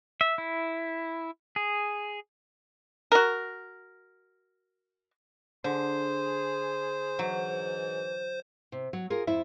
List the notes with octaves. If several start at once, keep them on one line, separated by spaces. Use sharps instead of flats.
E5
E4
G#4
F#4 A#4
D3 G#4 C5 C6
G#2 E3 F#3
C3
F#3
F4 G#4 A#4
F2 E4 E5